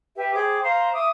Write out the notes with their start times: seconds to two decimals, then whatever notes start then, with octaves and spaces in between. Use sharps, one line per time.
0.16 G4 B4 E5
0.33 G#4 C5 G5 D6
0.62 C5 F5 A#5 C6
0.93 E5 D6 D#6